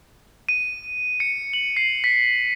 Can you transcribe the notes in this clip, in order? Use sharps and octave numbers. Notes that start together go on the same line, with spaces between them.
D#7
C#7
F#7
C7
B6